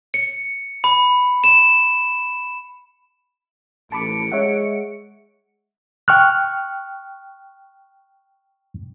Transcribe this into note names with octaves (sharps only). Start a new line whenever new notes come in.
C#7
B5
E7
A1 A5 B5 D6 C#7 D7
G#3 C#5 E5 F#5
G5 C#6 F6 F#6